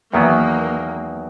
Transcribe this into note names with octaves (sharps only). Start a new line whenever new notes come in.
E2 D#3 F#3 A#3 B3